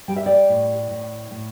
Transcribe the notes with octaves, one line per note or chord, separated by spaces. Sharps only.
G3 G5
E5
D5 G5
A2
A2
A2